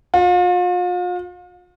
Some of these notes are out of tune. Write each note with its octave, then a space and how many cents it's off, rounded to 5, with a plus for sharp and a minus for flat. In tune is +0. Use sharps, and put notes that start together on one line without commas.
F4 +40